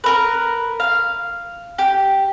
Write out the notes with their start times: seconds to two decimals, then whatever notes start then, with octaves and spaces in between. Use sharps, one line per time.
0.04 A#4 B4
0.80 F5
1.78 G4